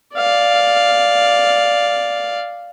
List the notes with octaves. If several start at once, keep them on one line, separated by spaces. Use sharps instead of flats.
D5 F5